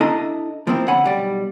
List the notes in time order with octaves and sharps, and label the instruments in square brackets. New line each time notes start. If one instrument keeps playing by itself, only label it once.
[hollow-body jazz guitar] D4 E4 A4 D#5 A5 A#5
F3 A#3 C4 E4
D3 C#5 F#5 G#5 B5
B1 G3 D5